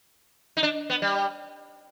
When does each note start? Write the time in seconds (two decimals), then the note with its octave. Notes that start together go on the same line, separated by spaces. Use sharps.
0.57 D#4
0.63 D4
0.90 B3
1.02 G3